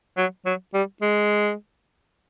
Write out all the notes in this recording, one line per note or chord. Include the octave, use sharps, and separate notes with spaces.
F#3
F#3
G3
G#3